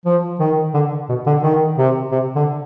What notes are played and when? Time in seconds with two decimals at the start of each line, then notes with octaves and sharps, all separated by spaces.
0.05 F3
0.40 D#3
0.74 D3
1.09 B2
1.26 D3
1.43 D#3
1.78 C3
2.12 C3
2.35 D3